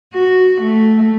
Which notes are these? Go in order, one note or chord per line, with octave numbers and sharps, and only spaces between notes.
F#4
A3